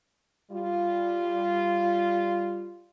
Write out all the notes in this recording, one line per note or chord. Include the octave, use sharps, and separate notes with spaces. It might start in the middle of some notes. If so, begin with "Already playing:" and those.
G3 F4